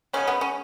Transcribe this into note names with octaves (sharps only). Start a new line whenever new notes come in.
C#3 G#3 B3 C#4
B3
C#4